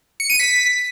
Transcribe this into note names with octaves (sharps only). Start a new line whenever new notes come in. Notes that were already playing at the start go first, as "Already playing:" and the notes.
C#7
D#7
B6